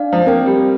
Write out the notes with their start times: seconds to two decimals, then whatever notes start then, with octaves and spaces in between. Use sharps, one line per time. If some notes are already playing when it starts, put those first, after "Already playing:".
Already playing: D4 D5 F5
0.13 F3
0.26 A#3 C4 A#4 G5
0.46 G3